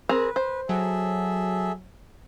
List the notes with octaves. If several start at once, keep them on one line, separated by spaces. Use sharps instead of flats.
C4 G#4 A#4 B4
C5
F#3 G#4 A4 E5